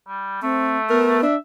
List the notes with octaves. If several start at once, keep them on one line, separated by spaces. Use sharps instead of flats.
G3
A3 C4
B3 A#4
D4 E5